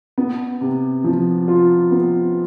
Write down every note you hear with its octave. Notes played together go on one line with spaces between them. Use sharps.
B3
C3
F3
F4
B3